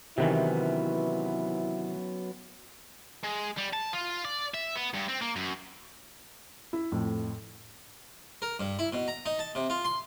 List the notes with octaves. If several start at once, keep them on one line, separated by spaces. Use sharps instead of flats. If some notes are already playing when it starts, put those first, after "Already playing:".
C3 D#3 E3 F#3 B3 C#4 E4
G#3
G3
A5
F4
D5
E5
B3
G2
C4
A#3
F#2
E4
F2 A2
A#4
G2
E4
B2
A#5
D#4
A5
C3
F4
C6